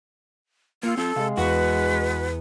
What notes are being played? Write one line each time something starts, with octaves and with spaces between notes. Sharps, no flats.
A#3 F4 E6 C7 C#7
C4 F4 A4
C3 G#3 F5
E2 F#4 B4 F#5